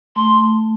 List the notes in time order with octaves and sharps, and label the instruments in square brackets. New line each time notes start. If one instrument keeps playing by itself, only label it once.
[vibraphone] A3 [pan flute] C6